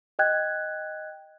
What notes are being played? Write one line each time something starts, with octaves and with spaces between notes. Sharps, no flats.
D#5 G5 F#6 G#6